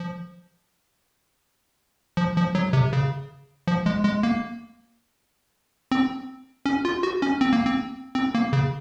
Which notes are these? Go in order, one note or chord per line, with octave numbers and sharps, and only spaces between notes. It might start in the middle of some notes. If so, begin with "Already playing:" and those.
Already playing: F3
F3
F3
F#3
C3
C#3
F3
G#3
G#3
A#3
C4
C#4
F4
F#4
C#4
C4
A#3
C4
C4
A#3
C#3